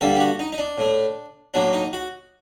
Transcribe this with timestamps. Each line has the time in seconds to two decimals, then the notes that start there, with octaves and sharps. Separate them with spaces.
0.01 G2 D3 G3 A#3 A4
0.15 G4
0.20 F#4
0.39 D#4
0.52 D#4
0.58 D4
0.78 A2 A3
1.54 A2 F#3 A#3 D4
1.73 D#4
1.93 F#4